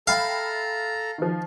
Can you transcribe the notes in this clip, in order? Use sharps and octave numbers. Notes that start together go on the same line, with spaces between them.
A4 E5 F5 G5 A#5 B5
D#3 F3